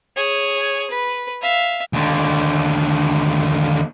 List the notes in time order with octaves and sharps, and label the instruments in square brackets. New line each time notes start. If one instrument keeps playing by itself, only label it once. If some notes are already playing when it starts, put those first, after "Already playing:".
[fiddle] G#4 C#5
B4
E5 F5
[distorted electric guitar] D#2 D3